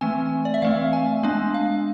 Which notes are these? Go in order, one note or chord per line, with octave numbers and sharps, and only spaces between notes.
E3 A3 C4 G#5
D5
E5
E3 A3 C4 F5
G#5
G#3 B3 D4 G#5
F5